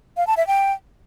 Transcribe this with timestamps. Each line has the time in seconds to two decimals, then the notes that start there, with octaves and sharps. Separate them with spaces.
0.17 F5
0.27 A5
0.37 E5
0.47 G5